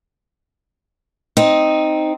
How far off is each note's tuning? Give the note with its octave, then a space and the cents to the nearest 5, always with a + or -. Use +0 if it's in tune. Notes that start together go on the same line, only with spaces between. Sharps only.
C4 -5 D#4 +0